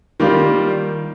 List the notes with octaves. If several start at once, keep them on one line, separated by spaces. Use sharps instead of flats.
D#3 G3 A#3 F4